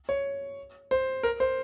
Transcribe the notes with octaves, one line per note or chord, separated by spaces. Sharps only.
C#5
C5
A#4
C5